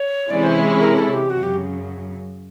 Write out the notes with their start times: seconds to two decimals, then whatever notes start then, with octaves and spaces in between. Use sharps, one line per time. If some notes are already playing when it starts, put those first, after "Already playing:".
Already playing: C#5
0.30 C3 E3 G#3 C#4 E4 D5
0.44 C5
0.55 C#5
0.80 A#4
0.96 A4
1.13 G4
1.30 F#2 C#3 F#3 F#4
1.43 G4